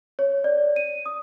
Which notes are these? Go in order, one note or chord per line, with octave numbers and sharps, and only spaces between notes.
C#5
D5
D#7
D#6